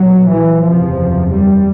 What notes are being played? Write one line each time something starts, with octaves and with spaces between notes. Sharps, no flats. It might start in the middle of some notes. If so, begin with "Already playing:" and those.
Already playing: B1 A#2 F#3
E3
F#1 E2 C3 F3
G3